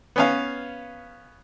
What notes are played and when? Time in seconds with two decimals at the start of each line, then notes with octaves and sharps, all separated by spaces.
0.16 B3 C#4 F5